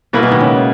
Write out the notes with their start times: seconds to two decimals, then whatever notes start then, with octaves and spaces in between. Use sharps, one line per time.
0.13 B2 A#3 B3 E4 B4
0.23 G#3
0.32 D#3
0.40 C#3